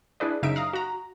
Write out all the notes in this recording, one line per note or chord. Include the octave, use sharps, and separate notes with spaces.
D4 E4 G#4 B4 D5
F#2 C#3 D#4 E5 B6 D7
F5 A#5 D#6
F#4 A#5